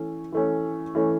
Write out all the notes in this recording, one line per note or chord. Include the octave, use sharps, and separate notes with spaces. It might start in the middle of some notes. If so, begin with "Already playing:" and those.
Already playing: E3 A3 C#4
E3 A3 C#4
E3 A3 C#4